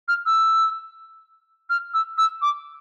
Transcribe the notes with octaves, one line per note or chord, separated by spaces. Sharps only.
F6
E6
F6
E6
E6
D6